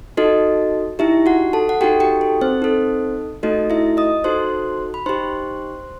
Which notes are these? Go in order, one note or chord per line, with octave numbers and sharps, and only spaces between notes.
D#4 F#4 A4 D#5
D#4 E4 G4 E5
F#4 F#5
A4 A5
F#5
D#4 F#4 G4 A4 G5
G4 G5
A4
C4 C5
D#4 A4
A3 D#4 F#4 A4 D#5
E4 E5
D#5 D#6
D#4 F#4 A4 C5 C6
B5
D#4 G4 C5 C6